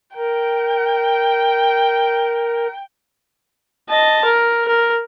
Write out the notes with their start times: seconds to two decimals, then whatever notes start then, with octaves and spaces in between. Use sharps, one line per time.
0.16 A#4 G5
3.89 D#5 A5
4.24 A#4
4.68 A#4